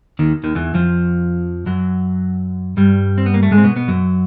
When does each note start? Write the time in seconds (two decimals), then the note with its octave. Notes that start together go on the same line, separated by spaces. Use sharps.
0.19 D#2 D#3
0.44 D#2 D#3
0.55 E2 E3
0.74 F2 F3
1.66 F#2 F#3
2.77 G2 G3
3.18 C4
3.26 B3
3.34 A#3
3.43 A3
3.51 G#2 G#3
3.58 C4
3.64 B2 B3
3.76 B2 B3
3.88 F#2 F#3